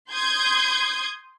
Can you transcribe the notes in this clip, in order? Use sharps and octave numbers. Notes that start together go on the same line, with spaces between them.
C6 D#6 G6 G#6